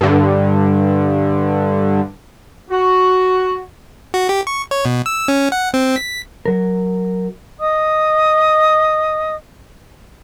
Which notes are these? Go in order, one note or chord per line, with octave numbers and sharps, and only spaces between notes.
G2 D3
F#4
F#4
G4
C#6
C#5
B2
E6
C#4
F#5
C4
B6
F#3 A#4
D#5 D#6